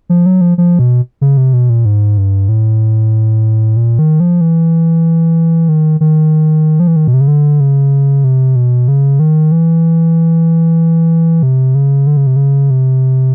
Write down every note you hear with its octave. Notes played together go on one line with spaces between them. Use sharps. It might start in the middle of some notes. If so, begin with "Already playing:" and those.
F3
F#3
F3
F3
B2
C#3
C3
B2
A#2
G#2
G2
A2
A#2
D#3
F3
E3
D#3
D#3
F3
E3
D#3
B2
C3
C#3
D3
C#3
C3
B2
C#3
D#3
E3
C3
C#3
D3
C#3
C3
C#3
C3